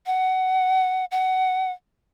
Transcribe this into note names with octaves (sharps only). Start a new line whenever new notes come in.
F#5
F#5